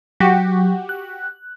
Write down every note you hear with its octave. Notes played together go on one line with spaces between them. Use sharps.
F#3 F#4 G4
F#6